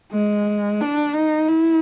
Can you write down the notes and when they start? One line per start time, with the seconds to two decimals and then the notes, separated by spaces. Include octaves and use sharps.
0.12 G#3
0.81 D4
1.15 D#4
1.49 E4